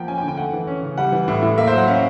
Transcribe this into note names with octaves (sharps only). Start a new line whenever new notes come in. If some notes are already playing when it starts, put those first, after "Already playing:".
Already playing: F3 A#3 F#5 G5
C#4 G#5
G5
D3
G5
A3 F#5
E3
C#4
C#3
G3 F#5
E3
A2
A2
A#3 E5
F#3 C5
F#5
C#4 F5